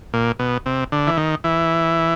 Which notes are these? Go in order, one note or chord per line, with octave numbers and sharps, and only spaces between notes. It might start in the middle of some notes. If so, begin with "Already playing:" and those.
A#2
B2
C3
D3
E3
D#3
E3